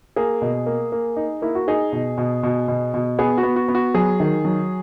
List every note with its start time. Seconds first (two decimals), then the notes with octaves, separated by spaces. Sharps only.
0.16 A#3 G#4
0.42 B2
0.66 A#3
0.92 A#3
1.17 D#4
1.42 A#3 E4
1.55 F#4
1.68 D#4 G#4
1.92 B2
2.18 B2
2.43 B2
2.68 B2
2.94 B2
3.19 B3 G#4
3.38 F#4
3.43 B3
3.56 F#4
3.68 B3
3.75 F#4
3.94 F#3 G#4
4.20 D#3
4.45 F#3